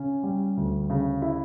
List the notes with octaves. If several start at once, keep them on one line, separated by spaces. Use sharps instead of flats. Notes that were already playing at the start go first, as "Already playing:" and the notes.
Already playing: C#3 C#4
G3
D2
C#3
E4